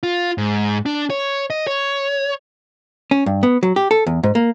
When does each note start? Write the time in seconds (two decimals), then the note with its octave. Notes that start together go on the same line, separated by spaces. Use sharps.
0.03 F4
0.38 G#2
0.86 D4
1.10 C#5
1.50 D#5
1.67 C#5
3.11 C#4
3.26 G2
3.43 B3
3.63 F#3
3.76 G4
3.91 A4
4.06 E2
4.23 G#2
4.35 A#3